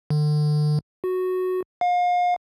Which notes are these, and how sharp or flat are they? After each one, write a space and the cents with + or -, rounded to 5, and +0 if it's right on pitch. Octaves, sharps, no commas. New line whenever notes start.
D3 +35
F#4 -5
F5 +35